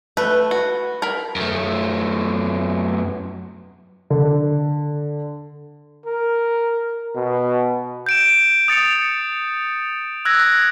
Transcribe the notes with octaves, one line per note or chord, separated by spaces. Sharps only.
A3 B4
F#4
A#4 B5
F#2 A3
D3
A#4
B2
G6 D7 E7
D#6 A6 C#7 F7
E6 F#6 G#6 A#6